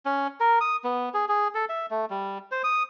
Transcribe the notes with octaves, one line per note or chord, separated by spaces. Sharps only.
C#4
A#4
D#6
B3
G#4
G#4
A4
E5
A3
G3
C5
D#6